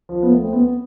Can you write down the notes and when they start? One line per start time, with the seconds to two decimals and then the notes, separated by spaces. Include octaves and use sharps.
0.09 F3
0.23 B3
0.31 A3
0.44 C4
0.53 B3